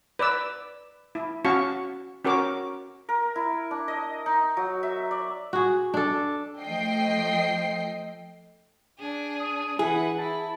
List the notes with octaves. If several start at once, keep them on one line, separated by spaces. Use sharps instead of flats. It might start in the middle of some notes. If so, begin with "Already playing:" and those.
B4 D5 D6 E6
E4
C#4 F#4 F5 A5 C#6
C#4 F#4 A#4 C#5 D6
A#4
E4
D4
D#5
D#4
F#3
E5
D5
F#4 G#4
D4 A4
F3 A3 D#5 G5 C7
D4 G#4
D#6
E3 E4 G#4 B4 F#5
E4 A5